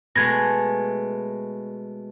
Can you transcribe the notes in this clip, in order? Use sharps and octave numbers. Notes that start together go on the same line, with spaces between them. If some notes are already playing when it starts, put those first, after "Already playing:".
B2 G#3 A3 G#6 A#6